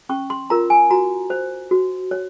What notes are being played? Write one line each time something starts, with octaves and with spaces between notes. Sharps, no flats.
C#4 C#6
C6
F4 A#4 A#5
G#5
F#4 A#5
C5
F#4
C#5